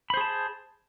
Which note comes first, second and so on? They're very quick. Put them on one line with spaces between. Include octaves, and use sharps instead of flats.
B5 C5 G#4 A5